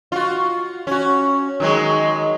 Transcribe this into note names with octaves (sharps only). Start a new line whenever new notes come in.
F4 F#4
C#4 F#4
D#3 F#3 G#3